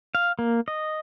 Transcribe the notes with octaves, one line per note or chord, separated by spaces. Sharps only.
F5
A#3
D#5